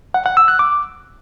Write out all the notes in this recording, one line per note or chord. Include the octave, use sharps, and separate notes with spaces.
F#5
F#5
E6
F#6
D6